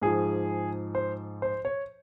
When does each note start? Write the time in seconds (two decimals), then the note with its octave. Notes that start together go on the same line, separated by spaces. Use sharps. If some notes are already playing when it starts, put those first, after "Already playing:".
0.02 G#2 F3 G#4
0.95 C5
1.42 C5
1.65 C#5